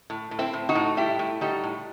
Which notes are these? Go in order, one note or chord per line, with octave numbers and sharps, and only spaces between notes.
A2
A2
C4 E4
A2
D#4 F#4
A2
G3 E4 G4
A2
G3 D#4 F#4
A2